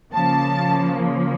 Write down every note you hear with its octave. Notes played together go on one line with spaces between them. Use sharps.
C#3 F3 A#3 A5